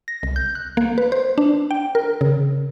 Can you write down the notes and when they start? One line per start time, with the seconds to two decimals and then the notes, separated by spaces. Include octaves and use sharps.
0.08 A#6
0.23 C2
0.36 G6
0.55 F#6
0.77 A#3
0.98 B4
1.12 C5
1.38 D4
1.71 G5
1.95 A#4
2.21 C#3